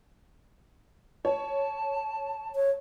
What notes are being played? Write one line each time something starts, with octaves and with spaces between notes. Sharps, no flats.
C#5 A5
C#5